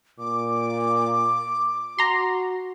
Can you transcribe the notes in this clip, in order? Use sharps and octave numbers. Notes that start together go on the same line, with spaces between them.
A#2 D6
F#4 A#5 C6